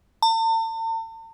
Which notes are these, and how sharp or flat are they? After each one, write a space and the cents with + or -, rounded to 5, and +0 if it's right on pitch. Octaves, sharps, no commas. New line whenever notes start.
A5 +45